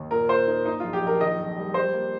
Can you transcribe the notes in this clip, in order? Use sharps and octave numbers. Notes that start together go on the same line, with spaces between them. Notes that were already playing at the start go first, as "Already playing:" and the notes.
Already playing: D#2
A#2 A#4
A#2 C5
D#4 A#4
A#2 D#4
A#1 F4
G4
A#1 A#4
D#3 D#5
F2
G3
G3 C5
A#3